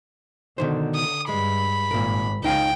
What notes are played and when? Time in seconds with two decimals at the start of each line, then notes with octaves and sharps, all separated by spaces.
0.58 B2 D3 D#3 C5
0.95 D#6
1.29 G2 G#3 B5
1.91 G#1 A#2 A#4
2.44 C#2 C#3 D#4 F5 G5 G#5